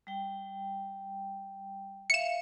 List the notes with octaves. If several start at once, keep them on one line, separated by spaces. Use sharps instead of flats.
G3 G5
E5 F5 C#7 E7